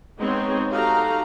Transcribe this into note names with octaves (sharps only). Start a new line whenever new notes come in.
G#3 B3 C4 D#4 G#4 C#5
D#4 F#4 G4 A4 F5 A#5